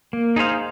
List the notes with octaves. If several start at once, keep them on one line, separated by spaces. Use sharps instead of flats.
A#3
D#4 G#4 C5 F5